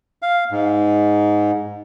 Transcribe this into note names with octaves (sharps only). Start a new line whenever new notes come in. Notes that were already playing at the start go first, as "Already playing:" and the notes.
F5
G#2